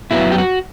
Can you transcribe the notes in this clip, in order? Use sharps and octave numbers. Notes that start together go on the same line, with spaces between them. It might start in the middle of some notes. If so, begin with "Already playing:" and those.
F#2 F#3 B3 E4
G4
F#4